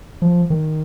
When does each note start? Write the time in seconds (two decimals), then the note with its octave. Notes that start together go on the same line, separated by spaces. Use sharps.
0.22 F3
0.50 D#3